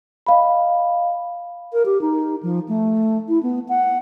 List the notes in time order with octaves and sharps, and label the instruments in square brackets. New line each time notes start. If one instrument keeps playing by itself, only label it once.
[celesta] D#5 F5 B5
[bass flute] A#4
G4
D#4
F3
A3
E4
B3
F#5